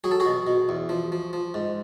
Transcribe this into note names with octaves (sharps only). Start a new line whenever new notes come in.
F#3 G#4
A4
F#4 G#4
B2
B2
E2
F3
F3
F3
G#2